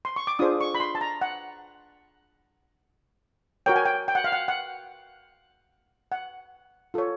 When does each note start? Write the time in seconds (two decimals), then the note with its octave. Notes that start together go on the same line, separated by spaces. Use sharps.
0.05 C6
0.16 C#6
0.27 D6
0.39 D4 F4 G#4 C5 D#6
0.61 C#6
0.75 B5
0.80 C6
0.95 A5
1.01 A#5
1.21 F#5
3.66 F#4 A#4 C#5 G5
3.76 G#5
3.86 G5
4.08 G5
4.15 F#5
4.24 F5
4.32 F#5
4.48 F#5
6.12 F#5
6.94 F4 A4 C#5